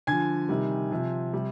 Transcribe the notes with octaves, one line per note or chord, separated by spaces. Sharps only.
D3 F3 G#5 G#6
C3 D#3 G3
C3 F3
C3 G3